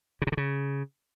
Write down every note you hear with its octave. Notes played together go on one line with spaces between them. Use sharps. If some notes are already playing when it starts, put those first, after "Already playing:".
C#3
C3
D3
C#3